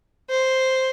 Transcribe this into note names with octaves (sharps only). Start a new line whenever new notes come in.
C5